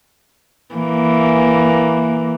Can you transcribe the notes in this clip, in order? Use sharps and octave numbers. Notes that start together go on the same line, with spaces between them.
E3 A#3